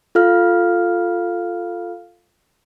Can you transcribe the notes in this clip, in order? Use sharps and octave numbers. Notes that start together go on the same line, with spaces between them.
F4 A4 F5 F6